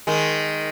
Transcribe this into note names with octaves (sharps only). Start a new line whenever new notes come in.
D#3 G#3